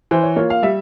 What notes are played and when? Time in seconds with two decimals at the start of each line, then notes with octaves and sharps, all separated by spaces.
0.11 E3 C5
0.23 C#5
0.36 A#3 F4 C#5
0.50 F5
0.63 G3 E5